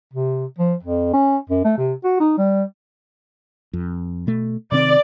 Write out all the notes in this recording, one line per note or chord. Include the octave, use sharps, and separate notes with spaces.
C3
F3
F2
C#4
F#2
A3
C3
F#4
D#4
G3
F2
B2 A3
C3 D#3 C4 D5